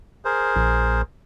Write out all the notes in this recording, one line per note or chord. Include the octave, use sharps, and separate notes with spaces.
G#4 A#4 C5
A#1